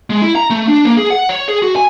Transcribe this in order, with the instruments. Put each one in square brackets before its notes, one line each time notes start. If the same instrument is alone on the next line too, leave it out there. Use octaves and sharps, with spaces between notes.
[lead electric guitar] G#3
E4
A#5
A3
D4
A#3
G#4
F#5
C#5
G#4
F#4
G#5